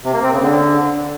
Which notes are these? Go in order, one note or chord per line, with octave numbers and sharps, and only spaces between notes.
C3
A#3
C4
C#3
D3